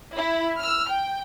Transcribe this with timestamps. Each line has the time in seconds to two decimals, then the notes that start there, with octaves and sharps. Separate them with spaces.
0.15 E4
0.59 E6 F6
0.89 G5